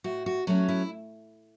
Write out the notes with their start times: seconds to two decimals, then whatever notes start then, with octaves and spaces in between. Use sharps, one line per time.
0.04 A2 F#4
0.26 F#4
0.47 F#3 A3 C#4 F#4
0.69 E4